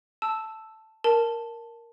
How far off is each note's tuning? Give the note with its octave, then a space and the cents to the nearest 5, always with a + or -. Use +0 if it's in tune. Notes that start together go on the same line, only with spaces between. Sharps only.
A5 +0 E6 +0
A#4 +0 A5 +0